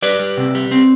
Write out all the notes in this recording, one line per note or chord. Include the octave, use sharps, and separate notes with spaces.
G3 B4 D5
G3
C3
G3
C4